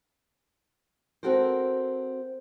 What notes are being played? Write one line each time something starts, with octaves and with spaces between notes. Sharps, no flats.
C4 F#4 A4 A#4 C5